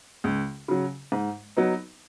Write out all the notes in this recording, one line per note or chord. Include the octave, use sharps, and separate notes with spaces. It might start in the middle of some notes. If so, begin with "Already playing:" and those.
C#2
C#3 F#3
G#2
F#3 B3 D#4